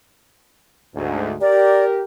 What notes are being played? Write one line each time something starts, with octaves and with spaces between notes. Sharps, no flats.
D2 G#2
G4 A#4 D5